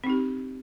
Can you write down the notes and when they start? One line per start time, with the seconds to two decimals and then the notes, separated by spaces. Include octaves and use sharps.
0.04 C4
0.07 D#4
0.10 G4